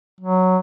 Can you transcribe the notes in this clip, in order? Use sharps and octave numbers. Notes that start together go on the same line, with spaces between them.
F#3